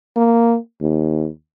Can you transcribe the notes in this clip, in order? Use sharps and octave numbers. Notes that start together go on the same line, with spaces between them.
A#3
D#2